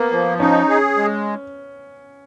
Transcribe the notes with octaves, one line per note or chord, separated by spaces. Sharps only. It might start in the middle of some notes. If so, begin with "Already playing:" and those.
Already playing: A#3 B3
F3
C#4 D#4
G#4
G#3